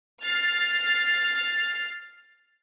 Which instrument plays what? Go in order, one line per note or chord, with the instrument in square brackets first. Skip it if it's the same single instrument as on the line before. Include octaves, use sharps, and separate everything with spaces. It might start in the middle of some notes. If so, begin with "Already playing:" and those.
[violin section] F6 A6 C7